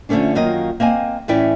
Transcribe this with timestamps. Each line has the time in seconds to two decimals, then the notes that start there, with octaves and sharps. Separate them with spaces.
0.09 D3 F3 A3 C#4 D4
0.35 F#2 D#3 F#3 A#3 F4 D#5
0.80 A#3 C4 D#5 G#5
1.28 A2 E3 C#4 E4 D5 G5